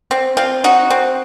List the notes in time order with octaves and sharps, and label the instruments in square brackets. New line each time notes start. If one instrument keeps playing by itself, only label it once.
[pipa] C4
C4 F4
D#4 F#4
C4